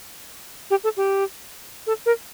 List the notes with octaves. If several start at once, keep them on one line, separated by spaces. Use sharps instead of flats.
G4
A4
G4
A4
A#4